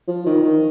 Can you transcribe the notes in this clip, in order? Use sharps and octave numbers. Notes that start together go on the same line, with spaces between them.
F3
D#3
D#3